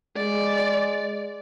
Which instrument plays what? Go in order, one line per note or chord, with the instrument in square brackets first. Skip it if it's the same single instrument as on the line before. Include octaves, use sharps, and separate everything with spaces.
[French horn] G#3 [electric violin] D5